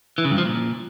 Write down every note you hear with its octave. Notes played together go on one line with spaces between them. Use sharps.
E3
C#3
G2
F3
A#2